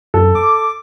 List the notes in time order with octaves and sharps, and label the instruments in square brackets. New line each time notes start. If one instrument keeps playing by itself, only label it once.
[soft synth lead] F#2 [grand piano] A4
[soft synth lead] D6